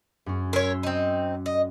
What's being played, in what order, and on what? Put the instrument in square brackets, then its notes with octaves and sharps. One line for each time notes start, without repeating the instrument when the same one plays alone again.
[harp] F#2 C#4
[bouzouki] A#4 C#5 [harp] C6 E6 B6
[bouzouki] C4 D#4
D#5